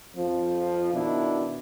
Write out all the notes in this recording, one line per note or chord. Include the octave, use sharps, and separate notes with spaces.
F2 F3
B2 D#3 D4 E4